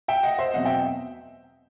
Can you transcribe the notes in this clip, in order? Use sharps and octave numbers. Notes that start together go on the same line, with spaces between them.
E5 G5
D#5 F#5
C5 E5
E2 B2 F#3 C4 D#5 F#5
E5 G5